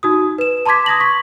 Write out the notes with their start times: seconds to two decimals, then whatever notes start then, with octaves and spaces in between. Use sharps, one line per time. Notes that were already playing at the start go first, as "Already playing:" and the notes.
0.03 D#4 F#4 D#6
0.38 B4 E7
0.66 A5 A#5 C6 D6 G#6 B6
0.86 D#6 G#6 A#6 F#7
1.00 C#6 B6